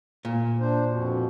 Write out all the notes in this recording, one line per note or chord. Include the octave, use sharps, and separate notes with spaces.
A#2
D4 C5
F2 B2